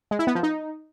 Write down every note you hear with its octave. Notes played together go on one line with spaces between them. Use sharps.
G#3
E4
B3
F3
D#4